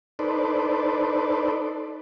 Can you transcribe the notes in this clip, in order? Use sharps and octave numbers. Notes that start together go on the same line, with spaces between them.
D#4 A4 B4 C5 D5